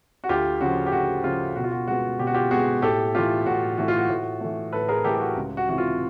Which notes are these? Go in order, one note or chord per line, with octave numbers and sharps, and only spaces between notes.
F#4
D2 F4 G4
C#3 F3 F#4
G4
D2 F#4
C#3 F3 F4
B2 F#4
F4
F#4
G#3 B3 F#4
B2 G4
F#4
F4 G4
G#3 B3 F#4 G#4
A2 G4 A4
E3 A3 F4 G4
A2 F#4
E3 A3 F#4
F4
F#4
A2
E3 A3
A2 A4 B4
G#4 A#4
E3 A3 G4 A4
G4
F#4
C#2
F#4
C3 E3 F#4
F4